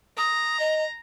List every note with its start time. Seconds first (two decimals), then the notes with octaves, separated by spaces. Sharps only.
0.17 A#5 D#6
0.59 D#5